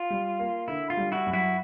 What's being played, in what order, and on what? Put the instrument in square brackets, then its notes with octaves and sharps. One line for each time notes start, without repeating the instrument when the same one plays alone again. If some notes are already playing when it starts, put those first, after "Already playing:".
Already playing: [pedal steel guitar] F4
[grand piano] G3
A#3
[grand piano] D3 [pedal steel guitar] E4
[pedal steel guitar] F4
[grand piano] G3
[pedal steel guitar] E4 F#4
[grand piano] F#2
[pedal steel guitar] E4 F#4